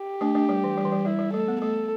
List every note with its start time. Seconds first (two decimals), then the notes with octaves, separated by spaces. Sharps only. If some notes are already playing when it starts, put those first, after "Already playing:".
Already playing: G4
0.21 A3 D4
0.35 A3 D4
0.49 G3
0.64 E3
0.77 G3
0.85 E3
0.92 G3
1.05 G3 E4
1.19 G3
1.33 A3 A4
1.48 B3
1.61 A3 A4